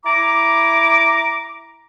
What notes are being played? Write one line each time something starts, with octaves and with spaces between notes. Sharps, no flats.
E4 A#5 D6